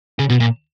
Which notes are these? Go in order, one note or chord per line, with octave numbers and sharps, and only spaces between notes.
C#3
B2
A#2